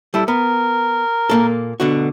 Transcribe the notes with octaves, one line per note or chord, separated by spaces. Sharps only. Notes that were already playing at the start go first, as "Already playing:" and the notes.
G3 E4 A4
B3 A#4
A#2 A#3 A4
B2 D3 F#4